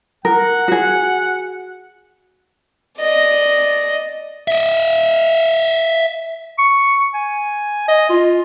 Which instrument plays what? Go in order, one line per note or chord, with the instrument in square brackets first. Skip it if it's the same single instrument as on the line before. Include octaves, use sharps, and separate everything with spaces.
[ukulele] A#4 [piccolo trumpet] F#5
[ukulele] F#4 G#4
[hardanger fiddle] D5 D#5
[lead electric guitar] D#5 E5
[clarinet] C#6
G#5
D#5
F4